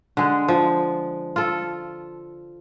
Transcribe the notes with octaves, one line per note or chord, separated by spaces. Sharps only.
D3 G#3
F3
F4 A4